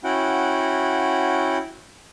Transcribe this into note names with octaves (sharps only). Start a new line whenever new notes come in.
C#4 E4 F#4 F#5 G5